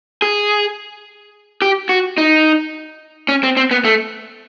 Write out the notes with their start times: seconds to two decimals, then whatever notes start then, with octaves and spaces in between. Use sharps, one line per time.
0.22 G#4
1.62 G4
1.89 F#4
2.18 D#4
3.29 C#4
3.43 C4
3.57 C4
3.71 B3
3.85 A3